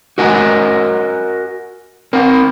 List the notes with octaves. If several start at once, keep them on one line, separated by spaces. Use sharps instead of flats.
F#4 A#4 D#5 G#5
C4 A#4